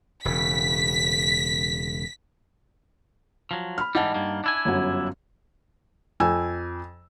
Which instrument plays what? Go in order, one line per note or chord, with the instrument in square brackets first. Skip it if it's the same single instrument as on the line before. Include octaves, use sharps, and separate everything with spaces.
[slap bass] E1 C#3 [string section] B6
[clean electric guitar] F3 F#3
[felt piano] B5 F6
[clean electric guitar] G#2 E3 G3 [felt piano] D#4 F#5 A5
[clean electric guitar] G2 G3 A#3
D4 E4 G#5
[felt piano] G1 F#2 F#4
F2 G#5 E6